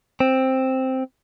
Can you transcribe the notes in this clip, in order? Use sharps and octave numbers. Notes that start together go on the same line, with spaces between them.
C4